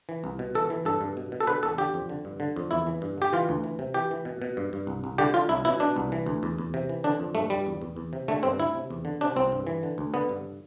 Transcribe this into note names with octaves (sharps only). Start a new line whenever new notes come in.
E3
C2
B2
E3 A4
E3
G2 A4
G2
B2
B2
A4
D3 B4
E2 A4
D3 G4
F2
D3
G2
D3
F2
E2 E4
E3
G2
D3 G4
E3 F4
D2
E3
C3
E3 G4
E3
B2
B2
G2
G2
C2
C2
D3 G4
D3 F4
C2 E4
B2 E4
B2 D4
C2
E3
D2
E2
E2
C3
E3
D3 D4
F2
G2 A3
G2 G3
E2
E2
E2
C3
D3 A3
G2 C4
D2 E4
C3
E2
D3
C3 D4
C2 C4
G2
E3
D3
D2
D3 B3
G2